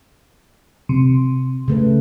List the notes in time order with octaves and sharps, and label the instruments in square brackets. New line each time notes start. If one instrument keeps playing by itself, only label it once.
[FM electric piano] C3
[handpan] C#3 A3 B4